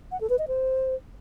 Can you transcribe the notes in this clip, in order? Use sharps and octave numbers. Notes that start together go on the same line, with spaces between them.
F#5
A4
B4
D#5
C5